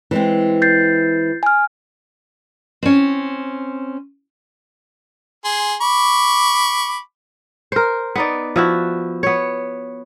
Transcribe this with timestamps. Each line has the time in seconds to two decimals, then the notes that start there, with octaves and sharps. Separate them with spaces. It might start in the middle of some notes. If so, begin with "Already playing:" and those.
0.11 E3 G#3 C4
0.62 G6 A6 C7
1.43 G#5 F6
2.83 C4 C#4
5.45 G#4 C6
5.81 B5 C#6 D6
7.72 A#4 C5
8.15 B3 D#4 D5
8.56 F3 E4 F#4
9.23 B3 C#5